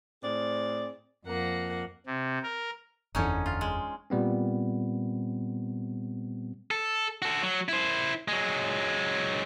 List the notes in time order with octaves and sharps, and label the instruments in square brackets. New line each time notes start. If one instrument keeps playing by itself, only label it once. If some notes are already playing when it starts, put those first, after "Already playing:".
[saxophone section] A2 C4 G#4 D5
[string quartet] F2 A#3 F#5
[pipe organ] C3
A#4
[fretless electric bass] F#1 E2 [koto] D3 C#4 D#4
[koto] F4
G#3
[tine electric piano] A#2 G3 B3 C4
[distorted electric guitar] A4
F#4 A4
F#3
E4 C5
F#3 G#3